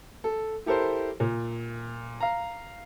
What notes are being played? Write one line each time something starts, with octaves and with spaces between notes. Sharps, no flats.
A4
E4 G4 A4 A#4 C5
A#2
F5 A#5